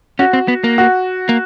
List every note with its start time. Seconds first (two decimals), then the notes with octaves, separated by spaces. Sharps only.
0.19 C#4 F#4
0.33 C4
0.48 B3
0.64 A#3
0.78 F#4
1.29 A#3